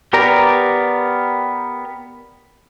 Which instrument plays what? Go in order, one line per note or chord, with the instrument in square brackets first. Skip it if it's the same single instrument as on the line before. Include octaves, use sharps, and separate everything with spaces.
[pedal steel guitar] B3 G4 A#4 D5 A#5